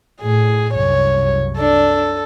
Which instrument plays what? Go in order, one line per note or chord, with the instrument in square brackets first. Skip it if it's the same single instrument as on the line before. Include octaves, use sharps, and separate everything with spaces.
[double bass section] A2 [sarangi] G#4
[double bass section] C2 F#2 [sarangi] C#5
[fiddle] D4 [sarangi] A4